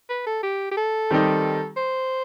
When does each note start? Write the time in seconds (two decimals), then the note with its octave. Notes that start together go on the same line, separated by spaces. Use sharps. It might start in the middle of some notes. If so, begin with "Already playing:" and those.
0.10 B4
0.27 A4
0.43 G4
0.71 G4
0.77 A4
1.10 D#3 G3 C4 D#4 G4
1.77 C5